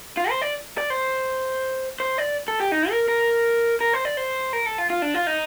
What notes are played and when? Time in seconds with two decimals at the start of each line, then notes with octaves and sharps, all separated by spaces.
0.17 F4
0.30 C5
0.42 D5
0.78 D5
0.90 C5
2.00 C5
2.18 D5
2.48 A4
2.60 G4
2.72 D#4
2.91 A#4
3.08 A#4
3.81 A#4
3.93 C5
4.05 D5
4.17 C5
4.53 A#4
4.66 A4
4.78 F4
4.90 F4
5.02 D4
5.14 F4
5.27 D#4